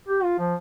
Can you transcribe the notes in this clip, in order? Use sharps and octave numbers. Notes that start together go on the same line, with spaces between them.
G4
F4
F3